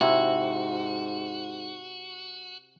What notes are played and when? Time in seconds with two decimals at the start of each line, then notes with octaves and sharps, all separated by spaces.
0.01 G#2 C3 E4 F#4